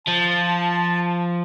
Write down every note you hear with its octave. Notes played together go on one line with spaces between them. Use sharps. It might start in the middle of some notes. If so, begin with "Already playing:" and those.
F3 A5